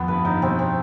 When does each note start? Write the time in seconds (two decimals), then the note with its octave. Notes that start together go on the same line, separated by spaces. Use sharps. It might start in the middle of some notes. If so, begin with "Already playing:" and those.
Already playing: F2 B3
0.08 G2 B4
0.25 G2 D#4
0.42 B2 C4
0.59 C4